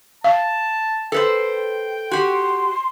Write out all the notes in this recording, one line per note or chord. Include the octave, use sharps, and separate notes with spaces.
F5 A5
A4 B4 C5 G5
F#4 G4 C6